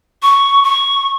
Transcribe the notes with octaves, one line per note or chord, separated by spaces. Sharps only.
C#6
C#6